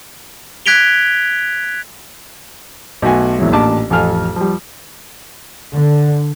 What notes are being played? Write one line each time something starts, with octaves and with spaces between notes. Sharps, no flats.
F#6 G#6 B6 D7 F7 G7
B1 A3 F#4 G#5
A#1 E2 E3 F#3 G#3
A1 A#2 D4 A5 D6
A1 F2 A4 F5 G#5 F6
F3 G3
D3